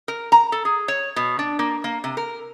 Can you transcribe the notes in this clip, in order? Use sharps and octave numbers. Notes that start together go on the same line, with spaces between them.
A#4
A#5
A4
G#4
C#5
B2
D4
A#3
A#3
C3
A#4